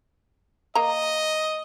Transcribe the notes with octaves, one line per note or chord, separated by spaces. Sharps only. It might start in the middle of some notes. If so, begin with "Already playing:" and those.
A#3 D#5 A#5